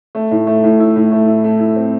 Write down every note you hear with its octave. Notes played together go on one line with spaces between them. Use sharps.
A3
A2
A3
A2
E4
A2
A3
E4
A3
E4
C4